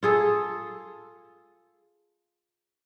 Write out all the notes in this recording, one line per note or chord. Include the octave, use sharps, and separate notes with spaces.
F4 G#4 A4